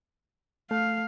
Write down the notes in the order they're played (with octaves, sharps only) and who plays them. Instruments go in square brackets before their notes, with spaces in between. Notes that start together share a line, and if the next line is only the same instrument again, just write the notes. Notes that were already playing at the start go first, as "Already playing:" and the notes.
[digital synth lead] A3 [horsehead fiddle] F5